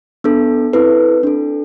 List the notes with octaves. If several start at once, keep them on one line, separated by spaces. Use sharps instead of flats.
B3 D4 A4
C4 E4 A4 B4
D4 A4